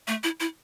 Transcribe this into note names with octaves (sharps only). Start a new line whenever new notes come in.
A3
E4
E4